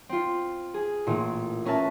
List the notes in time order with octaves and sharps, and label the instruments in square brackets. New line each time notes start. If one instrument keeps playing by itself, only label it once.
[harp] C4 F4
G#4
A1 A#2
C#4 A#4 B4 E5 A5